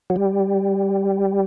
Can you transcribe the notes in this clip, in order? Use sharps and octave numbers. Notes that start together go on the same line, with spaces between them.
F#3
G3